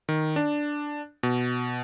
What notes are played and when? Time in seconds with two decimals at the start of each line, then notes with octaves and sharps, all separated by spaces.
0.09 D#3
0.36 D4
1.23 B2